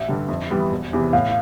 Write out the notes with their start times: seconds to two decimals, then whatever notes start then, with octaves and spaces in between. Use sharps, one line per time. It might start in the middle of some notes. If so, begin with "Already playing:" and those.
Already playing: A1 E5
0.08 G2 D3 G3
0.29 F2
0.50 E3 G3 B3
0.72 E1
0.93 E2 C3 E3
1.13 A2 F5